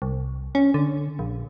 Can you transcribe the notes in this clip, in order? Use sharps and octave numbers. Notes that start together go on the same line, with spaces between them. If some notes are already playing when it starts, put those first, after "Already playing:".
C2
C#4
D3
A#1